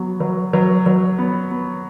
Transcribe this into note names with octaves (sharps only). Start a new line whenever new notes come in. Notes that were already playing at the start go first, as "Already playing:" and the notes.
Already playing: F#3 B3
F#3
F#3
F#3
B3
B3